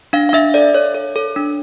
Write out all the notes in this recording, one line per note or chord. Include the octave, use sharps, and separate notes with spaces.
D4 F5
F5
D4 E5
A4 D5
A4 C#5
A4
A4
D4